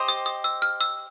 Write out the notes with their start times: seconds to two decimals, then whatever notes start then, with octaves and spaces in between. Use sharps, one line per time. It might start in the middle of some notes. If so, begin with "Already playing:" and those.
Already playing: G4 C5 D#5
0.08 D#6
0.26 D#6
0.44 E6
0.62 F6
0.81 E6